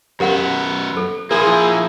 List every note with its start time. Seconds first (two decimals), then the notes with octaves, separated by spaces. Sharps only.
0.20 F#2 B3 G4 A#4 F#5
0.97 A4
1.31 F3 A#3 E4 G#4 A#4